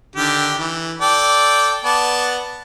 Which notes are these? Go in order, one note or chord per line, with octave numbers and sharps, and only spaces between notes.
D3 D#3 G4
E3
A4 D5 G5
B3 D5 A5